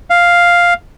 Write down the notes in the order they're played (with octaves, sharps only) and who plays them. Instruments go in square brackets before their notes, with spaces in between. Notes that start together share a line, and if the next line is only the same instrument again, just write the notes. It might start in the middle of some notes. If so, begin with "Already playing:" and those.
[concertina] F5